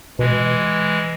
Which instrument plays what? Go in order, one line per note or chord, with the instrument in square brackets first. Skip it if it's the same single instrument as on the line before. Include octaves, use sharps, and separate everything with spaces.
[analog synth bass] B2 [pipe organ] E3 G#3